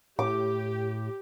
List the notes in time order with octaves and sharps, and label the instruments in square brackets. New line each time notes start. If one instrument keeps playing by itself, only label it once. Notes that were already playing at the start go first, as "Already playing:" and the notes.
[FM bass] A2 [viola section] G4 [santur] D6